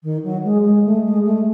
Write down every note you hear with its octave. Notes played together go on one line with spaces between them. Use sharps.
D#3
F#3
G#3
G#3
A3
G#3
A3